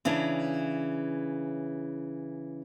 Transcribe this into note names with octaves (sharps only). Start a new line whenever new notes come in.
C#3 E3 C#4 D4